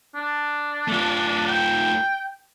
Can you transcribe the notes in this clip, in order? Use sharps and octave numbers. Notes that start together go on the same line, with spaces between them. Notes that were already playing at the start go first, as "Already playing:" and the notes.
D4
A3 F4
G5